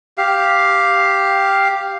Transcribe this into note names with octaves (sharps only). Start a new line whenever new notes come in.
G4 F5